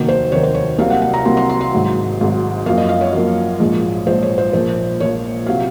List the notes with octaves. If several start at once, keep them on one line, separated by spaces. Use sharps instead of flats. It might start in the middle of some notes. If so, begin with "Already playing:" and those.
Already playing: F1 D#2 D#3 F#3 A#3 A#4
C5
F1 D#2 D#3 F#3 A#3 C#5
C5
C#5
C2 C3 F#3 A#3 F5
F#5
F#5
A#5
C2 C3 F#3 A#3 C6
C6
C6
C6
G#1 G#2 F#3
G#1 G#2 F#3
F#2 F3 A#3 F5
D#5
F5
C#5
F#2 F3 A#3
A#1 G#2 F3 G#3
A#1 G#2 F3 G#3 C5
C#5
C5
A#1 A#2 F3 A#3 C5
A#1 A#2 F3 A#3 C#5
C3 F#3 F5